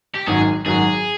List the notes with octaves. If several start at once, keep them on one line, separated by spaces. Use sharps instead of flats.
G4
G#1 F#2 D#3 F#3 G#4
G#1 F#2 D#3 F#3 G#4